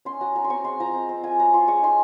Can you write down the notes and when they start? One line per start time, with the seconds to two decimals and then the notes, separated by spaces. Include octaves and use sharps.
0.05 C#4 C6
0.21 F#3 A#5
0.36 F#3 A#5
0.44 C6
0.50 C4 C#6
0.64 G#3 C6
0.80 F3 A#5
0.94 C4
1.09 C4
1.24 F4 G#5
1.39 F#3 A#5
1.53 F4 C6
1.68 G#3 C#6
1.83 D#4 C6